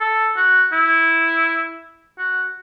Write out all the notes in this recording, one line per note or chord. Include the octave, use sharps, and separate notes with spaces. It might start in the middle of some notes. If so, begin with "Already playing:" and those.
A4
F#4
E4
F#4